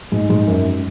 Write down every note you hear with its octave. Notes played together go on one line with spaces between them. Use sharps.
G#2
G#2
F#2